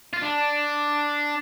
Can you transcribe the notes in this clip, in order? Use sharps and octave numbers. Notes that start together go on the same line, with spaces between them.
F4
D4